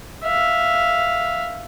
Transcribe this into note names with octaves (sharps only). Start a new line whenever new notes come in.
E5 F5